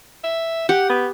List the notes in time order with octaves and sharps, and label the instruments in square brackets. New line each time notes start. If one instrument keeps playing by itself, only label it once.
[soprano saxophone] E5
[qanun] G4 [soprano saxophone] F#5
[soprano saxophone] B3